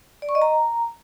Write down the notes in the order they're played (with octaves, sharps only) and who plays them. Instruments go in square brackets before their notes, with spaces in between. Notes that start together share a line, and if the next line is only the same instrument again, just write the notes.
[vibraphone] D5
C#6
D#5
A#5